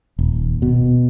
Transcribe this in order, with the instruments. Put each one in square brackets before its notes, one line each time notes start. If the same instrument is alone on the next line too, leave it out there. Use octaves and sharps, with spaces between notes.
[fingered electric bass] D#1
B2